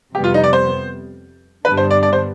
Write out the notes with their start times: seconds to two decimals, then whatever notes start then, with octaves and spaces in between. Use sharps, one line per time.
0.15 F2 C3 G3 B3 G4
0.24 F4
0.34 D#4
0.44 D5
0.53 C5
1.65 G2 D3 G3 B3 D4 B4
1.77 C5
1.91 D5
2.03 D5
2.13 C5